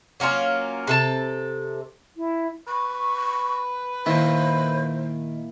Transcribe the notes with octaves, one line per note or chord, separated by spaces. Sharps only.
F#3 A#3 C#4 F4
C3 A4 A5
E4
B4 C#6
A#2 D#3 E4 C5